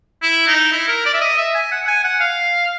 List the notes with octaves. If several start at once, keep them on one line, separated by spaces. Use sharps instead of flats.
E4
D#4
E4
A#4
D5
E5
D#5
E5
G#5
F#5
G#5
F#5
F5